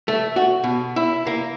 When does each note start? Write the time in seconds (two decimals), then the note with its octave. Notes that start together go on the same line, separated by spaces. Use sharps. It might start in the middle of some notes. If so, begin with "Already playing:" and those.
0.08 A3
0.36 F#4
0.64 B2
0.96 E4
1.27 A#3